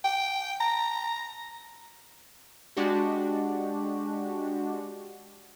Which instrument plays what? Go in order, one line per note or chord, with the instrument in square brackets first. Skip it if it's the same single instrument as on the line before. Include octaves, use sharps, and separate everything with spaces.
[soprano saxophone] G5
A#5
[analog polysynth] G#3 D4 F#4 G4